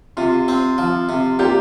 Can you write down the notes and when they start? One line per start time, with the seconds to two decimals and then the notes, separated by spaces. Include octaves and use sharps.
0.17 C3 F4
0.48 C4
0.78 F3
1.09 C3
1.39 A#2 G4